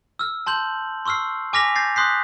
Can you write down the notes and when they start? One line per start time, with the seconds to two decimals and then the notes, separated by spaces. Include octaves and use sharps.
0.19 E6 F6
0.47 A5 C6 G6 F#7
1.05 C6 C#6 E6 F6 C7
1.53 G#5 D6 F6 A#6 B6 F7
1.75 G6 A6 C7
1.96 C6 D#6 F#6 G6 B6 C7